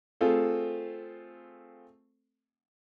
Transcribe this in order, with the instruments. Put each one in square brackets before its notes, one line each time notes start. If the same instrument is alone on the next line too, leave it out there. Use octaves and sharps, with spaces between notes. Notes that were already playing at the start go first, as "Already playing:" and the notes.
[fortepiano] A3 C4 F4 G#4 A4